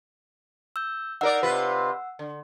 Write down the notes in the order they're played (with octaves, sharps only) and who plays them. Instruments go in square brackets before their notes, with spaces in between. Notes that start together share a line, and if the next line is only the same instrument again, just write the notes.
[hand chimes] E6 G6
[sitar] D#4 A#4 D5 [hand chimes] F#5 E6
[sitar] C3 F4 B4
D3